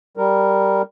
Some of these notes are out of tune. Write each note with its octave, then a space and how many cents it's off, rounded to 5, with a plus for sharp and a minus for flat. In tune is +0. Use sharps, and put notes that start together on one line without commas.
G3 +0 A#4 -10